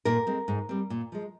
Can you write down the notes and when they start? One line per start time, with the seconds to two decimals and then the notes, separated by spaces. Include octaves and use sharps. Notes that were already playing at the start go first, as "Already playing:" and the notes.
0.05 A#2 A#4
0.27 G#3 C4
0.48 G#2
0.69 G3 C4
0.90 A#2
1.12 F3 G#3